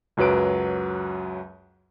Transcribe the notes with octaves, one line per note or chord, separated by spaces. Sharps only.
C#2 F#2 F#3 B4 D7